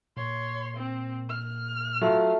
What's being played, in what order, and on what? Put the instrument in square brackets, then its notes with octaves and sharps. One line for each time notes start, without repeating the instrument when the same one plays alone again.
[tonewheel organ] A#2 [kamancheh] C#5 C6
[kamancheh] C4
F6
[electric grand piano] F#3 F4 [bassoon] A3